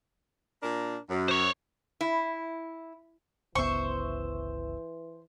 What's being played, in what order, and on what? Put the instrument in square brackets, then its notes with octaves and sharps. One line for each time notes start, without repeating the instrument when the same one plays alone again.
[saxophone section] A#2 D4 A#4
F#2
[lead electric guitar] C5 C#5
[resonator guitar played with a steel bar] E4
[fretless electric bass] G1 C#2 B3 [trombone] E3 [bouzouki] C5 [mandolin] E5 C#6